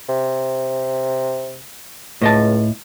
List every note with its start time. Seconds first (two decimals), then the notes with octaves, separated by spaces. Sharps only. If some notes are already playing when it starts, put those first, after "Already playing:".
0.09 C3
2.22 C#2 A2 D#5 A5